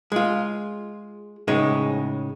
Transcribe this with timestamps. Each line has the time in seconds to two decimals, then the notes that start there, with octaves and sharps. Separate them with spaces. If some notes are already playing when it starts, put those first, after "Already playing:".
0.12 G#3 F4
1.48 A2 C#3 G#3 D#4